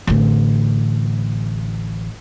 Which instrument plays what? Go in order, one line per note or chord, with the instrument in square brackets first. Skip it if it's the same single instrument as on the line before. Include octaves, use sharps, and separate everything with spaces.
[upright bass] A1 D3